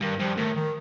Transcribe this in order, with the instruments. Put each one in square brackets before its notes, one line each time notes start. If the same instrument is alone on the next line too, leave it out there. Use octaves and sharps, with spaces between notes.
[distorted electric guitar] G2 [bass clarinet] D#3
[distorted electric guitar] G2 [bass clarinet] F3
[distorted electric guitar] A2 [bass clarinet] D#3
[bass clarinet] D#3